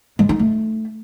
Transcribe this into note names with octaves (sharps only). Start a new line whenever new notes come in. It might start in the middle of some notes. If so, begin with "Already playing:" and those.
G#3
D#4
A3